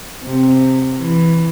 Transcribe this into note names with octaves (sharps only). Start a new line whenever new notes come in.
C3
E3